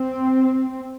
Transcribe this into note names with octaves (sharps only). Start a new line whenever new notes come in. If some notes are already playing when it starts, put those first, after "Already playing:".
Already playing: C4